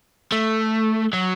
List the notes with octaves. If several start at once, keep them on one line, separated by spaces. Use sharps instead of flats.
A3
F#3